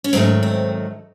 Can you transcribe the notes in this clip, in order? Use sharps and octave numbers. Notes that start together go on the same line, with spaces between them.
C#4
G#2 D#3 F#3 A3 C4
C4